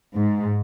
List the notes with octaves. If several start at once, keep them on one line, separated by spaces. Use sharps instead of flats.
G#2